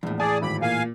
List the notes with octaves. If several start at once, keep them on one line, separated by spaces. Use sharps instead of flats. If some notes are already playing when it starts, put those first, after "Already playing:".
A#1 E2 A2
G#4 D5 G#5 A5 D#6
G#1 B5 D6
A#2 F5 G#5